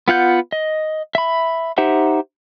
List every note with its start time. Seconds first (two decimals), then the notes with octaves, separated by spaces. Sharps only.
0.08 B3 F4 F#5 G6
0.52 D#5
1.15 E5 B5
1.78 D#4 G4 C5 E5 F#5